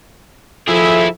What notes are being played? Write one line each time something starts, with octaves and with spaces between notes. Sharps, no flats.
F3 E4 G#4 A4 E5